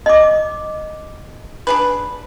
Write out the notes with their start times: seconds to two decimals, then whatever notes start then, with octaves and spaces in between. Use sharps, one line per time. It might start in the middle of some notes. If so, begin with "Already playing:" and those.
0.06 D#5 D6
1.67 D4 G#4 B4